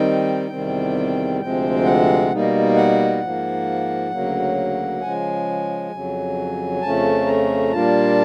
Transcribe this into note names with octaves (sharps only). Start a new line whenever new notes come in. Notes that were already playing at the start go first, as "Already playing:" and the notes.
Already playing: D#3 G3 C4 D#4 G5
E2 C3 D#3 G3 C4
D2 C3 F3 G#3 C4 G5
F#5
B2 G3 A#3 D#4
F#5
G#2 F3 A#3
D2 C#3 F#3 A#3
C#3 F3 G#3 G#5
F2 C#3 F#3
F2 C#3 F3 A3 C#4 A5
A#5
A#2 G3 A#3 D4 F4 A5